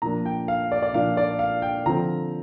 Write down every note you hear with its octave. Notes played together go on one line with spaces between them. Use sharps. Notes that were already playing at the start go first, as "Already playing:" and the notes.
A#2 F3 A#3 D4 A#5
G5
F5
D5
D5
A#2 F3 A#3 D4 F5
D5
F5
G5
D3 F3 C4 A#5